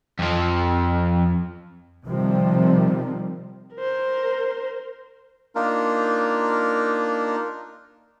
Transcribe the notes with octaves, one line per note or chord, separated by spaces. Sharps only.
F2 F3
C3 D#3 F3 G3 C4
A#4 C5
A#3 D4 D#4 F4 A#4